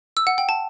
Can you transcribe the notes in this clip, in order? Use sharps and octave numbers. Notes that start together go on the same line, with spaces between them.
E6
F#5
G5
A5